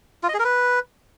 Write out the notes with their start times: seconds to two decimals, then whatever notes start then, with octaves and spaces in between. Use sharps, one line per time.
0.23 F4
0.29 D#5
0.34 G#4
0.39 A#4
0.45 B4